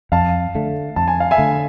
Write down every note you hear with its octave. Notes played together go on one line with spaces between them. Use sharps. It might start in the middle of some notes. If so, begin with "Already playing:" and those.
F2 F5 A5
D3 A3
F2 A5
G#5
F5
E5 G#5
D3 A3